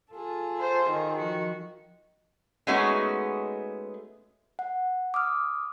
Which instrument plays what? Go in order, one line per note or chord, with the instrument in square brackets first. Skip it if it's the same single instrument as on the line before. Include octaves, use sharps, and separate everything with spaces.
[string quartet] F4 G#4 A4
[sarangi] C5
D#3
[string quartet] F3 F#4
[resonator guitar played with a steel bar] G#3 A3 B3 C#4 D#4 F#4
[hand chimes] F#5
D6 D#6 F6